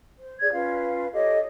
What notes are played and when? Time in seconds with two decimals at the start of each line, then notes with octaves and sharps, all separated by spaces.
0.18 C5
0.39 G#4 D5 G#6
0.51 C#4 F4 B4 F5
1.12 G4 A4 C#5 D#5